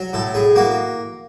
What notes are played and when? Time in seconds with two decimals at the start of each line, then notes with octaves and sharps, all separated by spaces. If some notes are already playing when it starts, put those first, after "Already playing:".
Already playing: F#3
0.13 A2 A4
0.34 A2 G#4
0.56 A#3 F#4